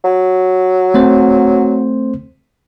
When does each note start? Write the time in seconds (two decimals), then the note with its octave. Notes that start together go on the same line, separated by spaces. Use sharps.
0.04 F#3
0.94 A3 C4 C5